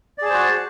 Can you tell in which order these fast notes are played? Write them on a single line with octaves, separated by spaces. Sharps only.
D5 G#4 A5 C5 F#4